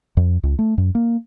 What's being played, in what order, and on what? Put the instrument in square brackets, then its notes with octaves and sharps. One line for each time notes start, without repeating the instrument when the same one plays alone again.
[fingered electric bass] F2
C#2
A3
F#2
A#3